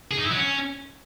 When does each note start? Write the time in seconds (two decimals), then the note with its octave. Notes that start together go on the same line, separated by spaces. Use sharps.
0.11 G#4
0.18 D#4
0.24 E4
0.31 F#3
0.37 C#4